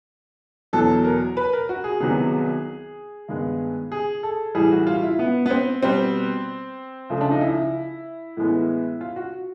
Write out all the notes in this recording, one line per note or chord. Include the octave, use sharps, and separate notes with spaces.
E2 B2 F#3 A4
A#4
B4
A#4
F#4
G#4
C2 C3 D#3 F#3 B3 G#4
G2 D#3 G#3 B3
G#4
A4
A2 E3 G3 G#4
F#4
F4
E4
B3
B3
C4
B2 G3 B3 C4
C#2 C#3 F3 A3
D4
D#4
E4
A2 E3 G#3 B3
F4
F#4